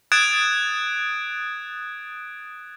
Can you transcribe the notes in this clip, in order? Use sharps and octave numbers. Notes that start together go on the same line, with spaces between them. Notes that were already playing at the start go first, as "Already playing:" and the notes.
D#6 F#6 G#6 A6 D7 E7